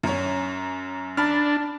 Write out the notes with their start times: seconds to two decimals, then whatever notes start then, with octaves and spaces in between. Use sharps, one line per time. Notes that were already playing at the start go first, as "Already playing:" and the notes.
0.03 F#2 C#4
1.17 D4 A5 B5 F6